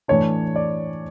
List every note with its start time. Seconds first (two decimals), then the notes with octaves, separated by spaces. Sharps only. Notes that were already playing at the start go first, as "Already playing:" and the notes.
0.08 A2 E3 A3 D4 C#5
0.56 D5